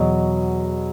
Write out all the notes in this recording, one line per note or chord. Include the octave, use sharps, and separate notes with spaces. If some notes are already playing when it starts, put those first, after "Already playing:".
Already playing: E2 B2 F#3 D#5